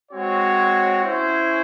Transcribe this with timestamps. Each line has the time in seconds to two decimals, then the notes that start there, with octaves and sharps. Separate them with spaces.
0.10 G#3 C4 F#4 C#5
1.03 C#4 E4 C5